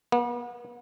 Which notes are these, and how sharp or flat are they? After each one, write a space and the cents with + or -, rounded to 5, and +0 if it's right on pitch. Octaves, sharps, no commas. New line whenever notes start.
B3 -40